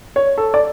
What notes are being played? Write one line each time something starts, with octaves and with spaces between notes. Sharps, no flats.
C#5
A4
D5